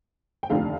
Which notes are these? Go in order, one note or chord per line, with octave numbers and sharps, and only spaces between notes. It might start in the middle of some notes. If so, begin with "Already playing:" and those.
G5
F1 D#2 D3 A3 F4 F5